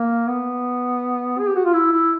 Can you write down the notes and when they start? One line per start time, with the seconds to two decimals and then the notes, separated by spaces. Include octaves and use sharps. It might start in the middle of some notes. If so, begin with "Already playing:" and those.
Already playing: A#3
0.27 B3
1.39 G#4
1.48 G4
1.56 F#4
1.65 F4
1.73 E4
1.92 E4